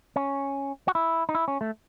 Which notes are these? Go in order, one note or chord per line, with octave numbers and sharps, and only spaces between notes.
C#4
F#4
E4
D#4
E4
C#4
A3